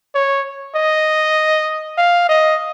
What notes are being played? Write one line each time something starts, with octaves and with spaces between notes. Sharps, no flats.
C#5
D#5
F5
D#5